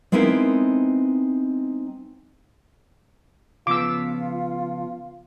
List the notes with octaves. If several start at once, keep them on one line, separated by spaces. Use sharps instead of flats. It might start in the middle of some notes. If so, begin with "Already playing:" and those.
G#3 B3 C4 D#4 E4 A#4
C#3 F3 B3 F4 D6 E6